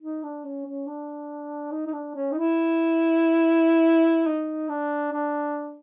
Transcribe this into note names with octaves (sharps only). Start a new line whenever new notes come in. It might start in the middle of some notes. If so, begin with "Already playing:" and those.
D#4
D4
C#4
C#4
D4
D#4
D#4
D4
C#4
D#4
E4
D#4
D4
D4